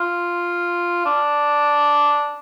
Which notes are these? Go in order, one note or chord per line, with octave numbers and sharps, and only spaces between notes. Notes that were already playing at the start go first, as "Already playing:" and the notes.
Already playing: F4
D4